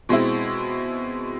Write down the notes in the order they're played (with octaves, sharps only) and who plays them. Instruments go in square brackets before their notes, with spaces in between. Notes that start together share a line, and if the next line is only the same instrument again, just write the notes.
[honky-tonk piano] B2 G#3 C4 E4